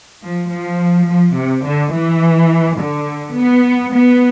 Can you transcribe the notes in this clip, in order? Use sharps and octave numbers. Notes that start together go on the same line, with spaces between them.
F3
F3
F3
C3
D3
E3
D3
B3
B3